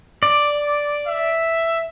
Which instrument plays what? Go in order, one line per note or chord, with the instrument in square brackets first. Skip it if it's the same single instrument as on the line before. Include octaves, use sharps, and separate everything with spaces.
[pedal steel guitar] D5
[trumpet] E5